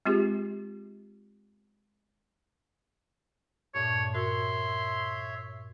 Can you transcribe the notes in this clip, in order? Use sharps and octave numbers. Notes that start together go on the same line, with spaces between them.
G#3 C4 F4 G4 G#4
G2 A#2 A3 D4 C#5
F#4 A#4 C#5 E5 C6